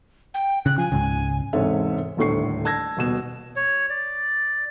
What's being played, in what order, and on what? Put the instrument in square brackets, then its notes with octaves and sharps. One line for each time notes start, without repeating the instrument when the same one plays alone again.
[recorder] G5
[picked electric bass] C#3 [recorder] F#6
[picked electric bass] F3 [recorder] G#5
[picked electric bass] C#2 G#2 C#3
[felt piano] E1 G#2 C3 A4 C#5 E5
D#1 D2 A2 C#6 C7
A5 E6 G#6 A#6
D#1 B2 E7
[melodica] C#5
D5